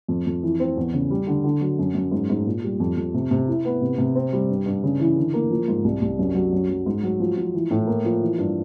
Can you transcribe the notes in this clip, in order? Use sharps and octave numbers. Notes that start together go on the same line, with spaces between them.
F2
F2
E3
C4
E2
C#3
G3
D3
D3
F#3
F#2
F#2
G#2
G#2
A#2
G3
F2
F2
C3
C3
E4
B3
C3
C3
C4
G3
G2
G2
C#3
E3
D3
A#3
F3
G#2
C2
C2
F#2
F#3
F#2
F#3
G#2
F#3
F3
F3
E3
A2
A#3
F3
E3
G2